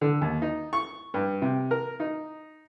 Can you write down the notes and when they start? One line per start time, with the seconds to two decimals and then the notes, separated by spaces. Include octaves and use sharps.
0.01 D3
0.21 D#2
0.42 D#4
0.73 C#6
1.14 G2
1.42 C3
1.71 A#4
2.00 D#4